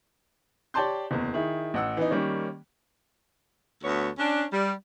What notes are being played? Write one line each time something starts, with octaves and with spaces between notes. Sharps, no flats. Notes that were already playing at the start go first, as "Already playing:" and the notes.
G4 C#5 D5 A5 C6 G6
F#1 E2
D#3 E4 G#4
A1 F#5 E6
E3 B3 D#4
D#3 G3 A#3 C#4
D2 B3 C#5
C#4 D4
G3